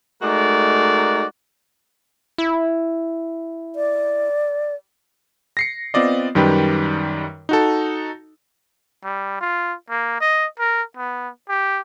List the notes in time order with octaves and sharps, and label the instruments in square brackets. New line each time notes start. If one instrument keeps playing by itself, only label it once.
[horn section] G#3 A3 D#4 F#4 A#4 D5
[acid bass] E4
[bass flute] D5
[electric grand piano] A#6 C7 C#7
B3 C4 F4 D5 D#5
F#2 D#3 G3 G4 B4
D#4 F#4 A4
[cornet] G3
F4
A#3
D#5
A#4
B3
G4